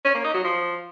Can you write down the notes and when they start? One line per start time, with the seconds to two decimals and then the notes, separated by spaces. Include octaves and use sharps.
0.05 C#4
0.15 A#3
0.24 D#4
0.34 F#3
0.44 F3